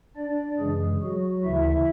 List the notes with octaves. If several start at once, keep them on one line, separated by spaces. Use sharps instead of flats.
D4 D5
F#2 C#3 E3 G#3 G#4
F#3 F#4
D2 C#3 E3 E4 E5